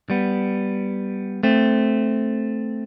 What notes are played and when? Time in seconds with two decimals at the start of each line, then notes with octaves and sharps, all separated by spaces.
0.10 G3 B3
1.43 A3 C4